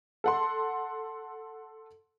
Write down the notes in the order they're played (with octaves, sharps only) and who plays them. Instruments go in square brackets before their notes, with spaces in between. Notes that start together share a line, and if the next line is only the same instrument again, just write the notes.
[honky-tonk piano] A4 F#5 C6